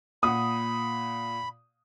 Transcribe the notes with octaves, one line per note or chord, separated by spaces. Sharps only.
A#2 F#5 B5 D#6